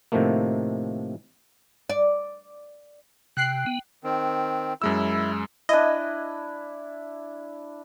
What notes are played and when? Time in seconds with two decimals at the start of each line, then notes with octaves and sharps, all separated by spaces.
0.12 A2 C3 D#3 F3 A3 A#3
1.90 D5
3.37 C3 G5 F#6 C7
3.66 B3
4.04 D#3 C4
4.82 F#2 G#3 E4 E6
5.69 D4 E4 D#5